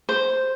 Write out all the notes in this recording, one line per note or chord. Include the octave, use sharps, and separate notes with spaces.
C5